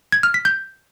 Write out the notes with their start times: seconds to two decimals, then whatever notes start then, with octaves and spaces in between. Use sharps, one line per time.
0.12 G#6
0.23 F6
0.34 B6
0.45 G6